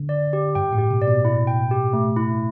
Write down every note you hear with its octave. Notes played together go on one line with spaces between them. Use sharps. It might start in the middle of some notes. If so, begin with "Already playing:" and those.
Already playing: D3
D5
G4
G2 G5
A2
G4
B2
D5
B2
E4
G5
G4
A3
E4